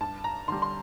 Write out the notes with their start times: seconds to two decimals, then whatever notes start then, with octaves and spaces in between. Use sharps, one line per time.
0.01 G2 A5
0.24 A#5
0.48 D3 G3 C6
0.62 C6